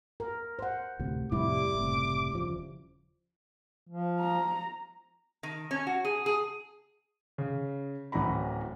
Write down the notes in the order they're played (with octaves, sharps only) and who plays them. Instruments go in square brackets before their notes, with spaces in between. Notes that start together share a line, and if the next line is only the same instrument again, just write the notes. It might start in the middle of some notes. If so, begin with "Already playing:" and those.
[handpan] A#4
C5 F#5
[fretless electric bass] D2 A2 C3
[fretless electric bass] F2 A2 C3 [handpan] G3 E4 [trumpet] D6
[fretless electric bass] F#1 A2 C3
D#1 C#3 F3
[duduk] F3
[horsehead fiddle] A#5
[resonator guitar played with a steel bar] D#3
C#4
F#4
G#4
G#4
[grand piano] C#3
D1 E3 C#4 F#4 A#5 B5